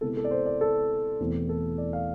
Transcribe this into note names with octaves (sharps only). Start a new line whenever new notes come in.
C3 G#3 B3 E4 A4
A4
D5
C5
D5
A4
E2 B2 A3 C4 E4
A4
D5
F5